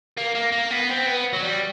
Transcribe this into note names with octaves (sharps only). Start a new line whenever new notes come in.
A#3
A#3
A#3
B3
C4
B3
F#3
G3